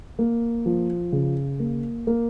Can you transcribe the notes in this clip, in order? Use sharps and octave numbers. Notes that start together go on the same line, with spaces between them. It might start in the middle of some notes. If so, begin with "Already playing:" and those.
A#3
F3
C#3
A#3
A#3